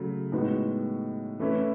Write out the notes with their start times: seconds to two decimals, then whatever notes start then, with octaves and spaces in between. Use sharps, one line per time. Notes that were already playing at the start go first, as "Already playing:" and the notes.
Already playing: C#3 F#3 A3
0.32 A2 G#3 B3 D#4 F#4
1.39 E3 A3 C#4 E4 B4